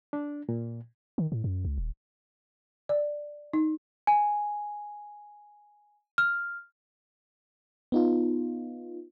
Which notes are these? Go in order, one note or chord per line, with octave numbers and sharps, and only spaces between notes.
D4
A#2
D#3
A2
F#2
C#2
D#1
D5
D#4
G#5
F6
B3 D#4 F4